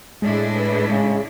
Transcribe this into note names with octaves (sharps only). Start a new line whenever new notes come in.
A2 G#3 D4 E4
B4
C#3 G#3